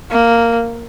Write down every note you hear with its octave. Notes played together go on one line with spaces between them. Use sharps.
A#3